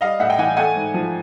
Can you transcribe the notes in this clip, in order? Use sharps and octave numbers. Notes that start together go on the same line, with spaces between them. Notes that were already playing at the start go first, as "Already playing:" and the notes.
G3 D#5 F5
A2 E5 F#5
G5
E3 F#5 G#5
A3 F#5 G#5
G#2
F3